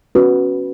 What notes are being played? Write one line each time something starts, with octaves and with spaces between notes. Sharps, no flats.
C#4 F#4 B4